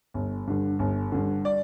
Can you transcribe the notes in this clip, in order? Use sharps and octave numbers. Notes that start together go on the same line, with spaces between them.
G1
G2 D3
G1
G2 D3
D5